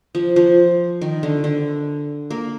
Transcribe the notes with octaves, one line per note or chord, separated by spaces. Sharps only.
F3
F3
D#3
D3
D3
A#3